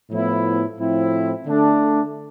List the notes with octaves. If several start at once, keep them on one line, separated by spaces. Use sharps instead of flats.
A2 F3 B3 E4
A2 F3 C4 E4
D3 A3 D4